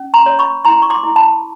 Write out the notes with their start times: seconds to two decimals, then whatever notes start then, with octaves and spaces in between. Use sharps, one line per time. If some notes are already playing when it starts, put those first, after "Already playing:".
Already playing: C#4
0.14 A#5 C6
0.26 C#5
0.39 B5 C#6
0.65 E4 A#5 C6
0.82 C#6
0.90 C6 D6
1.03 E4
1.16 A5 B5